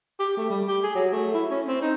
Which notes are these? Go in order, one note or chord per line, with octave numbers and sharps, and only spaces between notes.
G4
A3
G3
G4
G#4
F#3
A3
E4
C#4
C4
D#4